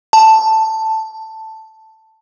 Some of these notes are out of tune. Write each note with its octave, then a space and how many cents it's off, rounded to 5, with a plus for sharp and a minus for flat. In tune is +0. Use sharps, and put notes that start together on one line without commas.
A5 +5